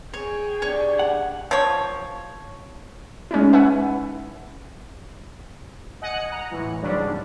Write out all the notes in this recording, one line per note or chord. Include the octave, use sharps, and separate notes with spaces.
G#4 C#5 G5 G#5
D4 G4 C#5 C#6
F#5
F3 C#5
G#3 C#4 D#4 E4
B4 E5 F#5 G#5
D#5 F#5 G#5 D#6 F#6 C#7
F#5 A#5
A2 E3
G#2 C#3 F#3 G3 D4
D#2